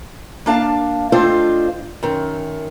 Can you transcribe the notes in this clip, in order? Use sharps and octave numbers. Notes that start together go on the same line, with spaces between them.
A#3 D4 F5 A5
A3 C4 D4 F4 C5 D#5
F#2 D#3